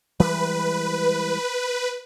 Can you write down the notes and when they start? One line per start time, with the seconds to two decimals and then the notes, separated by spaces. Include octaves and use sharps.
0.20 E3 G3 G#3 B4